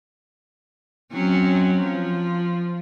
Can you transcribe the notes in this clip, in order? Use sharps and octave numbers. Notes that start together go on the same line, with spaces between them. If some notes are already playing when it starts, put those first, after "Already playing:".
F#3 C4 C#4
F3